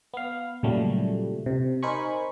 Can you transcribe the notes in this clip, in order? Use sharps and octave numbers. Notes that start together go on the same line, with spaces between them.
B3 F5
A#2 C#3 F#3 G3 A3
C3
D#4 A#4 C5 G#5 B5 C#6